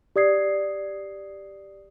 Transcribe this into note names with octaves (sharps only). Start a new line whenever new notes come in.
G4 D5 D#6 G#6 C7